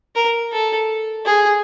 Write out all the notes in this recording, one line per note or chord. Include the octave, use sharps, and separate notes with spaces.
A#4
A4
G#4